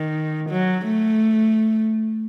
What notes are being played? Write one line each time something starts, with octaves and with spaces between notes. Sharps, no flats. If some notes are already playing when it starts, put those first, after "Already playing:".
Already playing: D#3
F#3
A3